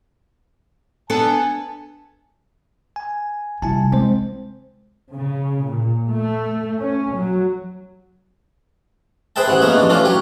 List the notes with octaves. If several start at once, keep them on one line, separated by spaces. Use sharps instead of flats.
B3 D4 A4 G#5 A5
G#5
C3 G3 E4 G#5 A5
G#3 C4 C5
C#3
A#2
A3
C#4
F#3
G#4 B4 C5 E5 G5 A5
A1 E3 F#5
F3 G#3 A#3 B3 C#5 E5
A1 D4
E3 A3 C#4 D4 F4
F#3 G4 C#5